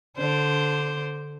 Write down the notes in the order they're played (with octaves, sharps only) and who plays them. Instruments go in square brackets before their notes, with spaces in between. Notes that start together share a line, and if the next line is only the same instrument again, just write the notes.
[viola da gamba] D3 D4 C5